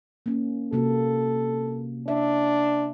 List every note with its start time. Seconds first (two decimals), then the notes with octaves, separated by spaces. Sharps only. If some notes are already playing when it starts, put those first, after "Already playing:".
0.26 A#3 C#4
0.73 C3 A#3 F#4 A4
2.08 D4 E5